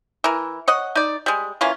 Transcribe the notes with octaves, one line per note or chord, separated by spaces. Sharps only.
E3 A#4
C#5 D#5 F#5
D#4 D5
G3 G#3
E3 A#3 C#4 F4